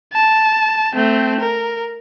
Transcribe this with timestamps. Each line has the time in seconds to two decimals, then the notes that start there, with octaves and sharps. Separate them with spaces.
0.13 A5
0.95 A3 C4
1.41 A#4